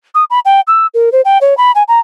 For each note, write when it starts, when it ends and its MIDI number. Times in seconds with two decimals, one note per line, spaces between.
0.15 0.24 87
0.30 0.39 83
0.45 0.61 79
0.67 0.86 88
0.94 1.12 70
1.12 1.21 72
1.25 1.38 79
1.41 1.56 73
1.57 1.72 83
1.75 1.83 80
1.88 1.99 82